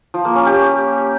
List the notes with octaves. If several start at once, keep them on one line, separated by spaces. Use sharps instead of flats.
F3
A#3
C#4
G4